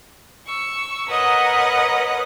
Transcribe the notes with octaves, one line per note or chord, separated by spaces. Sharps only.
C#6 E6
A#4 B4 C#5 D#5 F#5 A#5